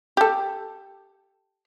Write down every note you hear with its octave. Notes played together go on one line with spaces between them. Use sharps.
G4 A4